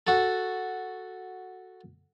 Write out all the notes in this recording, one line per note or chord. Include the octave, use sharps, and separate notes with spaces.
F#4 A4